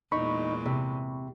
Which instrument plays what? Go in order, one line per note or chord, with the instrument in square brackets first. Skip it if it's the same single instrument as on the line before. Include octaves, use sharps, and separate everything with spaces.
[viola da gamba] E2 A#2 G#3 [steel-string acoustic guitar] D#4 [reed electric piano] B5 C#6
[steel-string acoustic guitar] C3